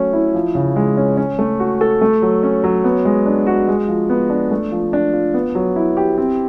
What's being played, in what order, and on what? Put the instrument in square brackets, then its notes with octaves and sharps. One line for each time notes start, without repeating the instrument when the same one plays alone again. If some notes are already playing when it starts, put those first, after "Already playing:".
Already playing: [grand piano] F#3 A3 C#4
E4
F3
C#3
G#3
C#4
C#4
A3
F#4
A4
A3
F#3
C#4
F#3
B3
G#3
D4
F#4
G#3
F3
B3
D4
A3
F3
D4
F4
B3
F#3
E4
G4
C4